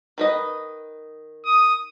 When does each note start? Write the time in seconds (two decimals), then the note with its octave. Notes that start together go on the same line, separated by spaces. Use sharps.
0.18 D#3 B4 D#5
1.45 D#6